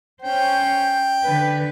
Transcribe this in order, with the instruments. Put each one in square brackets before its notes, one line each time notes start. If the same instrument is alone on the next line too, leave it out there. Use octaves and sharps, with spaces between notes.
[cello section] C#4 C5 [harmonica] G5
[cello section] D3 B4